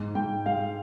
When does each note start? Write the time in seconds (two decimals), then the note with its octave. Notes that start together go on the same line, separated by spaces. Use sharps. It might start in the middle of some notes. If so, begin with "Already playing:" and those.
Already playing: G#2
0.15 G#2 G5
0.46 G#3 F5